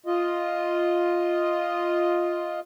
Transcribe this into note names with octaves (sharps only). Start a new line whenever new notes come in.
F4 D#5